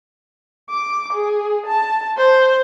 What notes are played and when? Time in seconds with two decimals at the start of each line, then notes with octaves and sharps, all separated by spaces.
0.70 D6
1.13 G#4
1.66 A5
2.17 C5